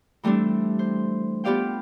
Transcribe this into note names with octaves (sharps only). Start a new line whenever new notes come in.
E3 G3 A3 C4 D4
C5
B3 F4 G4 D5 F5 G5